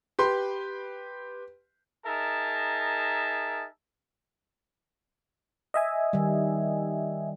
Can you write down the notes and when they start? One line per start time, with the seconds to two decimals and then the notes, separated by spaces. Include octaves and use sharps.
0.19 G4 B4 C6
2.06 D#4 G#4 A#4 E5 A5
5.74 D#5 E5 G#5
6.13 D#3 G3